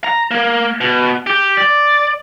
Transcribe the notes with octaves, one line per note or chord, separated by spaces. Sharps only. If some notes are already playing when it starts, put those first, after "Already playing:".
A#5
A#3
B2
G4
D5